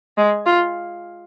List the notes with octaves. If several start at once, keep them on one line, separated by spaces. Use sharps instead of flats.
G#3
F4